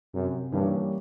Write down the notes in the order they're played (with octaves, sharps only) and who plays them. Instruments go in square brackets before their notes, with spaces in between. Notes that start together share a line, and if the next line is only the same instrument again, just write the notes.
[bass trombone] F#2 [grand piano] C3
[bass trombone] G2 [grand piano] E3 G3 A#3 C#4